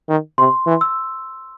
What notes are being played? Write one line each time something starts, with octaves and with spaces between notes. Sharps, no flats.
D#3
C3 C6
E3
E6